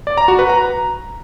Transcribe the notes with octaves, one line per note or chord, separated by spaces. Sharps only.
D5
A#5
F#4
B4
A#5